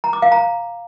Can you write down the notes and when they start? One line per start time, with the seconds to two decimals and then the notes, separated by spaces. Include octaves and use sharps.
0.04 A#5
0.13 D6
0.22 F5
0.32 A#5